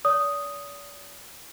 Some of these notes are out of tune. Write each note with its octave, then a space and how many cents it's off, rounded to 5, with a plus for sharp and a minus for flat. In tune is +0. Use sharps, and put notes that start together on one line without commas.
D5 -45 D#6 +0